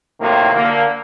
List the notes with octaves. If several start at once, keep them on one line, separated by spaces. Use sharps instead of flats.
A2 C3 D#3 F#3 A#3
D3 A#3